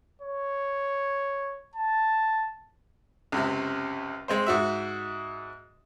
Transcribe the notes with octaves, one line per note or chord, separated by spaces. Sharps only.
C#5
A5
C#2 F#2 C3
G#3 C4 C5
G#2 F#4 E5